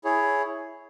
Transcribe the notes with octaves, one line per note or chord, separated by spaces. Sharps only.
E4 G#4 C#5